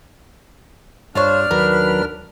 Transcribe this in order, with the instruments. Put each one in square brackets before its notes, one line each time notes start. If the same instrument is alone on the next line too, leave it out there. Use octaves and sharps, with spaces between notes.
[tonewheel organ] G2 [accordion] D4 F6 [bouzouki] F4 C5 C#5
[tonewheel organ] D#2 F#3 B4 [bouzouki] A#4